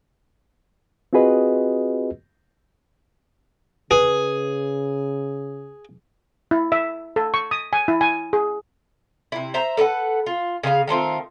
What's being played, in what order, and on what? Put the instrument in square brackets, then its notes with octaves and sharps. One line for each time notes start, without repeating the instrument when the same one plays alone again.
[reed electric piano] C4 F4 F#4 G#4 B4 D#5
[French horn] C#3 [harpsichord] G#4 [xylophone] B4
[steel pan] E4
E5
A4
C#6
D#6
G#5
E4
G#5
G#4
[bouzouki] C3 E4
C5 E5 A#5
A4 B4 E5 F#5
F4
C#3 G#4 B4 F5
D#3 A3 C4 F4